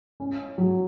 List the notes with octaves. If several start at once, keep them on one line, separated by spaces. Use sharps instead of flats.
C#4
F#3